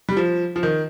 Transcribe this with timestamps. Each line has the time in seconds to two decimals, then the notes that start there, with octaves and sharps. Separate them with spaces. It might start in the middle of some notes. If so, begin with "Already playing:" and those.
0.09 G3
0.17 F3
0.56 F3
0.63 D#3